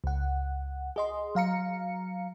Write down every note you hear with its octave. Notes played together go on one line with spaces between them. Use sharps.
C#2 F#5
G#4 D#5 C6
F#3 F5 A#5 C#7